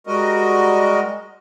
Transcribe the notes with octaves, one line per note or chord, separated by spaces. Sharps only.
G3 G#3 F#4 A#4 D#5